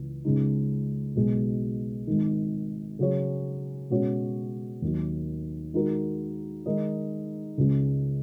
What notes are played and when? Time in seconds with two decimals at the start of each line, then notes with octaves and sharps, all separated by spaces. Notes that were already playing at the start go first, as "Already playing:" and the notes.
Already playing: C#2 C#3 E3
0.25 C#2 C#3 G#3 D#4
1.16 B1 B2 G#3
2.07 G#1 G#2 D#3
2.99 C#3 F#3 C#4 G#4 C#5
3.90 B2 G#3 C#4 F#4 C#5
4.82 D#2 D#3 F#3
5.74 D#3 G#3 D#4 F#4 A#4
6.66 D#3 G#3 D#4 A#4 D#5
7.58 C#2 C#3 G#3